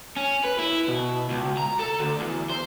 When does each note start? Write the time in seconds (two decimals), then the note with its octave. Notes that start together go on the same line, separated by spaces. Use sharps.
0.16 C#4
0.44 B4
0.59 E4
0.88 B2
1.30 C#2
1.57 A#5
1.80 A4
2.00 D2
2.20 E2
2.49 C5